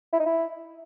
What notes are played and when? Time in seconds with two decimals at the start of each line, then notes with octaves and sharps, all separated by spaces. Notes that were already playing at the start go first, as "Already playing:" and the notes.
0.13 E4
0.20 D#4
0.26 E4